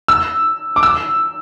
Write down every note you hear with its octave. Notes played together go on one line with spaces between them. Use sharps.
E6
D6
E6